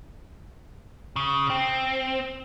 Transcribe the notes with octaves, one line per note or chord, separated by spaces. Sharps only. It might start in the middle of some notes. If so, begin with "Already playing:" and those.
C#3
C4